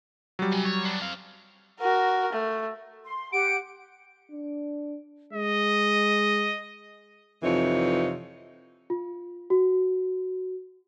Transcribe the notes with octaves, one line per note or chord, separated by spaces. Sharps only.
F#3 G3
C3 G#5
C#5
B3 D4
C4 F5
F#4 A#4
A3
C6
G4 F#5 D7
D4
G#3 D#5
F2 C3 E3 F3 D#4 C#5
F4
F#4